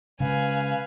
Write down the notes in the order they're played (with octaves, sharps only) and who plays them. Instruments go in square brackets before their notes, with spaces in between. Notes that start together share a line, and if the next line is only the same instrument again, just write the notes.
[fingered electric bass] C#3 G#3 [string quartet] B4 F5 G#5